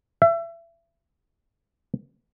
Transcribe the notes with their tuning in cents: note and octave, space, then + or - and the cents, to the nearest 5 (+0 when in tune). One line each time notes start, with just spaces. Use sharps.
E5 +30